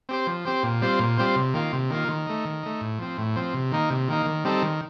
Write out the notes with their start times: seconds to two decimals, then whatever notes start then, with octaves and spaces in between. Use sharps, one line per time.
0.09 C4 G4 C5
0.27 F3
0.45 C4 G4 C5
0.63 A#2
0.81 G3 C4 F4 C5
0.99 A#2
1.17 G3 C4 F4 C5
1.36 C3
1.54 D#3 A#3 F4
1.73 C3
1.90 D#3 A#3 F4
2.08 D#3
2.27 A3 D#4
2.45 D#3
2.63 A3 D#4
2.81 A2
2.99 F3 C4
3.18 A2
3.36 F3 C4
3.54 C3
3.72 D#3 A#3 D#4
3.90 C3
4.08 D#3 A#3 D#4
4.26 D#3
4.45 G3 C4 D#4 A4
4.63 D#3